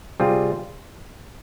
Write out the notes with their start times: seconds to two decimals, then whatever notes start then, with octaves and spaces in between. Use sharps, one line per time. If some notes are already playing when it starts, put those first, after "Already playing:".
0.20 C3 G3 C4 F4 G#4